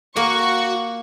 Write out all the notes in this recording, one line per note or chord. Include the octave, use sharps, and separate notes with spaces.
A#3 F#4 F#5 C#6